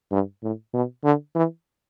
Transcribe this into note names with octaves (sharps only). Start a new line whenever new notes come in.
G2
A2
B2
D3
E3